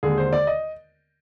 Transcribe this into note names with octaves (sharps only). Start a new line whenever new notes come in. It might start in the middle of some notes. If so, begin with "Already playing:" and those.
D#2 D3 G#3 G#4
C5
D5
D#5